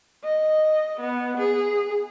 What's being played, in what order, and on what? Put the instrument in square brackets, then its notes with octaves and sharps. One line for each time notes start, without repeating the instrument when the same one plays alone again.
[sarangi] D#5
B3
G#4